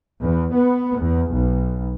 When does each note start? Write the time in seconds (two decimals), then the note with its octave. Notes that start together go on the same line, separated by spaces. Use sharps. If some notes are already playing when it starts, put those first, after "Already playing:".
0.22 E2
0.53 B3
1.00 E2
1.32 B1